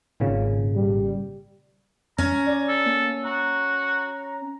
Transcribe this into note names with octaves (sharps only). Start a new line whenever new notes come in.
G#1 A#2 C#3
G3
C#4 A#5
D5
A4
A#3
F#4 A#5